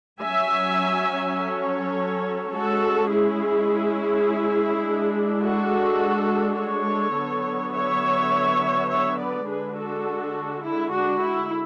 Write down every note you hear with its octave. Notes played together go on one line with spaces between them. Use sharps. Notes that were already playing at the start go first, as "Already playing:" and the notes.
F#3 C#4 E5 G#5
A4 C#5
G#3 C#4 F#4 A4
E4 G#4
G#3 D4
F#4 A4
A4 C#5
D3 F#3 B3
C#5 E5
C#5 E5
B4 D5
D3 G#3 D4 G#4 B4
F#4 A4
E4
D4 F#4
E4